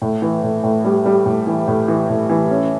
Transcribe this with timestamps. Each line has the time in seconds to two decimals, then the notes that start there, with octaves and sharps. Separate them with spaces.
0.02 A2
0.22 E3
0.43 A2
0.63 A2
0.85 G3
1.06 G3
1.26 A2
1.47 E3
1.68 A2
1.88 E3
2.09 A2
2.29 E3
2.51 C#4